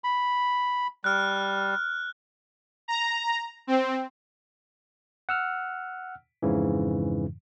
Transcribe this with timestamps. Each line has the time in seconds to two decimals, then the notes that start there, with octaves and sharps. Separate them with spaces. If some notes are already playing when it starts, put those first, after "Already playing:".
0.04 B5
1.04 G3 F6 F#6
2.88 A#5
3.67 C4
5.29 F#5 E6 F6
6.42 F2 G#2 C#3 E3